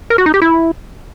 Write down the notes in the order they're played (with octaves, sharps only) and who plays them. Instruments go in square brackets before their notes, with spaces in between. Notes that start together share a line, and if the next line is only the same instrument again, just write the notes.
[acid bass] A#4
F#4
D#4
G4
E4